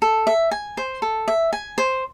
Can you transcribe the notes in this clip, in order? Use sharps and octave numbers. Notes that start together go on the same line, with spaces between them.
A4
E5
G#5
C5
A4
E5
G#5
C5